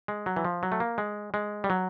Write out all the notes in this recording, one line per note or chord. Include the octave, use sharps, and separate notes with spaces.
G#3
F#3
E3
F3
F#3
A3
A#3
G#3
G#3
G3
F#3